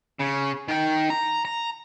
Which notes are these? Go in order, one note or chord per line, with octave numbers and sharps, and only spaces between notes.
C#3
D#3 G5
A#5
A#5